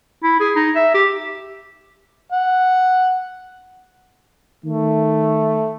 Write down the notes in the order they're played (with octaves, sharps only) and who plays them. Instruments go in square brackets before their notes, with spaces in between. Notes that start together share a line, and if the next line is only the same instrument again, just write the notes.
[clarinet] E4
G#4
D#4
E5
G4
[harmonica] F#5
[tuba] D#3 [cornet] A3